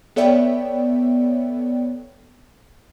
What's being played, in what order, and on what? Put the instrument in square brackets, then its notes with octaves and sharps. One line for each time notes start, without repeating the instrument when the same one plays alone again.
[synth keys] B3 A4 C#5 D5 E5 G5